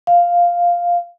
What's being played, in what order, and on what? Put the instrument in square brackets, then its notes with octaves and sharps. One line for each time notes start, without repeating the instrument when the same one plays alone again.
[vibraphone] F5